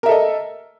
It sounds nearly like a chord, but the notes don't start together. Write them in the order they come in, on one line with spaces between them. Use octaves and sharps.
A#4 E5 A4 D#5